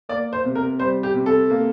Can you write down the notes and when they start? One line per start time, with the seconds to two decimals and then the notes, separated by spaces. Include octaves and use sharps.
0.09 A#3 D5
0.33 C5
0.45 C3
0.55 A#4
0.80 G3 C5
1.03 G4
1.14 C3
1.26 A4
1.50 A#3